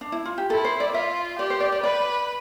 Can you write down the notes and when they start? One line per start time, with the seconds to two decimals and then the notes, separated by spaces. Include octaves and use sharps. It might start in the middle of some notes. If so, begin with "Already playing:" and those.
0.01 D4
0.12 E4
0.25 F4
0.38 G4
0.50 E4 A4
0.65 C5
0.80 D5
0.94 F4 E5
1.39 G4 D5
1.50 C5
1.60 D5
1.72 D5
1.83 B4 D5